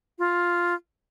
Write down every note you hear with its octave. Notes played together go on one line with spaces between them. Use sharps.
F4